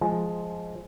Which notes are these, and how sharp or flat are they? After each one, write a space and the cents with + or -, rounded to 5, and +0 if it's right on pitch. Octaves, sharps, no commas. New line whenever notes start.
F3 +0 G#3 +10 G#5 +5